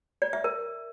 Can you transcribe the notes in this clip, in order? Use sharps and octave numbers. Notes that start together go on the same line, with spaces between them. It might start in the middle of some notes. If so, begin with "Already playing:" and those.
D5
E5
A#4